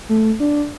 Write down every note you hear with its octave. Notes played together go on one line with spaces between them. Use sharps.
A3
D4